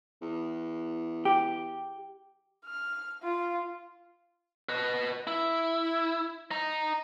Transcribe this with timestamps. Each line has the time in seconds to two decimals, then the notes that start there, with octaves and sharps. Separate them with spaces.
0.21 E2
1.25 G4
2.66 F6
3.23 F4
4.69 B4 D#5
5.27 E4
6.51 D#5 A#5